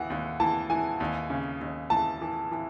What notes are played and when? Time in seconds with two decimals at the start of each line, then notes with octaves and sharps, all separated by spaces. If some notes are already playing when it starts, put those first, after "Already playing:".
Already playing: D#2 E3 F#5
0.10 D#2
0.40 E3 A5
0.70 E3 G#5
1.00 D#2
1.30 C#3
1.61 D#2
1.90 E3 A5
2.21 E3
2.51 E3